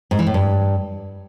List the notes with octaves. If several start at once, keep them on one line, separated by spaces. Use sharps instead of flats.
G#2
E3
A2
G2